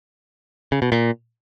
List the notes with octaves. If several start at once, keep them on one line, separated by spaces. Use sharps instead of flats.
C#3
B2
A#2